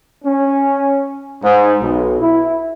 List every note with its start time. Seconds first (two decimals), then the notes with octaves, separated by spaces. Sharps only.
0.24 C#4
1.42 G#2
1.80 B1
2.20 E4